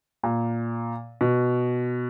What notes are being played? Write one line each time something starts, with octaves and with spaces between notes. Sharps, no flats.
A#2
B2